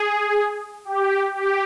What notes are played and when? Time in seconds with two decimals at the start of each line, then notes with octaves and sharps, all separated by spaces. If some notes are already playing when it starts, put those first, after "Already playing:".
Already playing: G#4
0.85 G4
1.35 G4